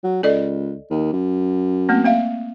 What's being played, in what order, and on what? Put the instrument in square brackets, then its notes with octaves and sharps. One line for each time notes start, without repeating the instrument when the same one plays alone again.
[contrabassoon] F#3
[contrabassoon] C#2 [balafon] A4 D5 D#5
[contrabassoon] D#2
F#2
[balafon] A3 A#3 C4
A#3 E5 F5